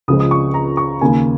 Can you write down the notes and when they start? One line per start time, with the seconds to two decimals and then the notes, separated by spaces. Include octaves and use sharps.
0.08 C#2 C#3 F3 G#3 D#6
0.20 D#6
0.31 C#6
0.54 A#5
0.77 C#6
1.01 D#2 C#3 A#3 G#5